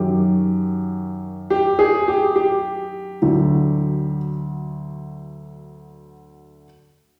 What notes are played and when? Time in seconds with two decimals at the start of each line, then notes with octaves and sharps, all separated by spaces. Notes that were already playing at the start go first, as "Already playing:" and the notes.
Already playing: F#2 D#3 F#3 G4
1.50 G4
1.79 G#4
2.08 G4
2.36 G4
3.22 D2 D3 F#3